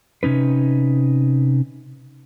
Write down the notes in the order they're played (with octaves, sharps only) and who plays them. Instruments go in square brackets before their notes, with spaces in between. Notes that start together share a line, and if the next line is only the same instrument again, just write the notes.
[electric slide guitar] C3 C#4 D#4 B4